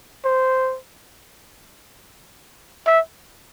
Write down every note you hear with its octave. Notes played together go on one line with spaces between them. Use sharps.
C5
E5